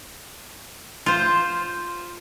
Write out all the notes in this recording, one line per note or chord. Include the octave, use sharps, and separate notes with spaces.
F4 C5